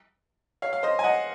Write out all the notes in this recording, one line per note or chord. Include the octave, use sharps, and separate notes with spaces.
C#5 F5
F5
C5 D#5
G#5
D#5 F#5